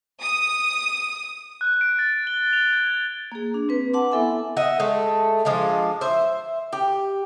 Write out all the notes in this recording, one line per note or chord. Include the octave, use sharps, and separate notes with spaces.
D#6
F#6
D7
A6
G7
F7
G#6
A#3 G#4
D4
C4 B4
F#5 A5 C6 D6
B3 E4 A4 E5 G#5
D#5 E5 F#5
G#3 A3
F3 G#3 D4 F4
C5 E5
G4